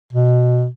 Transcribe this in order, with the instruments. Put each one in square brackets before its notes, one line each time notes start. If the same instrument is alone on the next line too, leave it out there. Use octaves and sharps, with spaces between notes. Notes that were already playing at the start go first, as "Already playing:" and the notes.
[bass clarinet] B2